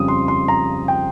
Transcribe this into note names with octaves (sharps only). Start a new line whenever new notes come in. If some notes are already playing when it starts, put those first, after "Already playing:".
Already playing: F2 C#3 G3 D#6
C6
C6
A#5
G5